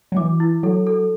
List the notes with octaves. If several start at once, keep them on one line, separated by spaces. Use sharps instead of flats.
F#3
E3 D6
E4
F#3 A4
A4